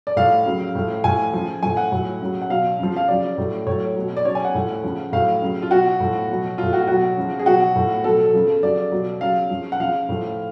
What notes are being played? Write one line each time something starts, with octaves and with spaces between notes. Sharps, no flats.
D5
A2 F3 F5
C#3 F#3
A2 F3
A2 F3 G#5
C#3 F3
A2 F3 G#5
F#5
A2 F#3
C#3 F#3
F#5
B2 F#3 F5
C#3 F3
F5
C#3 F#3 D5
A2 F#3
A2 F#3 C#5
B2 F#3
D5
C#3 F#3 C#5
G#5
F#5
A2 F3
C#3 F3
A2 F#3 F5
C#3 F#3
F4
B2 F#3 F#4
A2 F3
B2 F#3
A2 F#3 F4
F#4
B2 F#3 F#4
C#3 F3
G#4
B2 F#3 F#4
A2 F3
B2 F#3 A4
C#3 F3
C#3 F#3 D5
B2 F#3
C#3 F#3 F5
C#3 F3
F#5
C#3 F3 F5
A2 F3